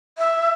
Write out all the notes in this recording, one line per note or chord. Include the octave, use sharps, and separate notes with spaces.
E5